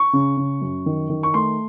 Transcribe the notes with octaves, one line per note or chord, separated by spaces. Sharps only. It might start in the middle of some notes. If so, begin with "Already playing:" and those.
Already playing: C#6
C#3
C#3
F#2
D#3
D#3
C#6
A3 C6